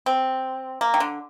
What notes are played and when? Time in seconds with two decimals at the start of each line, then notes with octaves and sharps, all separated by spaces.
0.06 C4
0.81 A#3
0.94 D#3
1.00 D3